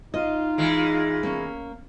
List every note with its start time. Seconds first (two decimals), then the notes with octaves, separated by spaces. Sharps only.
0.14 D#4 F4 D#5
0.58 E3 G#3
1.23 A#3 C#4